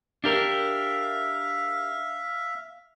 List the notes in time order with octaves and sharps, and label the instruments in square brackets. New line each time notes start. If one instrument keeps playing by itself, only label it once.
[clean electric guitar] D4 G4 A#4 [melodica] E5 F5